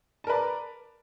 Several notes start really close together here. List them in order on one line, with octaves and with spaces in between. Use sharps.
A5 A#4 B4 D5